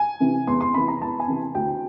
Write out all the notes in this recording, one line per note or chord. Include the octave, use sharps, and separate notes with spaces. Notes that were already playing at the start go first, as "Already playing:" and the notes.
Already playing: G#5
C3 E3
E2 C6
C6
C3 E3 B5
A#5
E2 A5
G#5
C3 E3
D2 G5